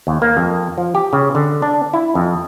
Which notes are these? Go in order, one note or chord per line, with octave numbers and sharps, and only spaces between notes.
D#2
A#3
F2
F3
G4
C#3
D3
D4
E4
F2